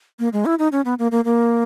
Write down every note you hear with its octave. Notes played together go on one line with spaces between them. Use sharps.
A#3
G#3
E4
D#4
C#4
B3
A#3
A#3
A#3